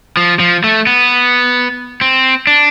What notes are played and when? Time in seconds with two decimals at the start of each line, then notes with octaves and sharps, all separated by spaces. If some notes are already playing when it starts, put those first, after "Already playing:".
0.17 F3
0.40 F3
0.64 A3
0.87 B3
2.01 C4
2.47 D4